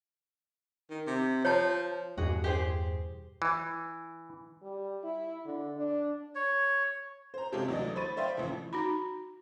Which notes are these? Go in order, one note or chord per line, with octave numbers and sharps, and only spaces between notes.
D#3
C3
F3 C#5 A5
E2 G2 B2 F#4 G#4
G4 G#4 C5
E3
G3
E4
D3
D4
C#5
C5 A#5
C3 G#3 C#4 F4 G4 A4
D2 E3 F#3 D5 D#5
C5 B5 C#6 A6 D#7
C5 D5 E5 F5 G5 C6
A1 C#3 E3 F3
D#4 F#4 B5